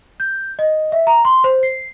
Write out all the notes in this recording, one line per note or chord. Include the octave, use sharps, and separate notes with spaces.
G6
D#5
E5
A#5
C6
C5
C7